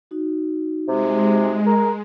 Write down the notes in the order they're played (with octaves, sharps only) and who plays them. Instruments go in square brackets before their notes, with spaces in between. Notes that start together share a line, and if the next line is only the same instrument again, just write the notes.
[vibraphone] D#4 F#4
[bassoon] C3 [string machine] G#3
[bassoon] A#4